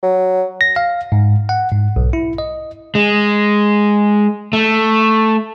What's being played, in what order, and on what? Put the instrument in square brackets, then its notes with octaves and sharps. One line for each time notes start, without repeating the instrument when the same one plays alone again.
[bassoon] F#3
[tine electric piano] A#6
F5
G#2
F#5
G#2
B1
E4
D#5
[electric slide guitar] G#3
A3